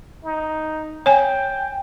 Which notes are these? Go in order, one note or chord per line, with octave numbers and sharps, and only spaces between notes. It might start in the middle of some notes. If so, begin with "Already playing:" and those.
D#4
C#5 G5 G#5